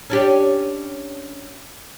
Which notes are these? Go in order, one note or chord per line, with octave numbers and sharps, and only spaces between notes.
C#4 D4 G4